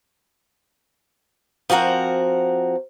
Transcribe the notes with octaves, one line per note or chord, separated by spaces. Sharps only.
F3 C4 F#4 A#4 F#5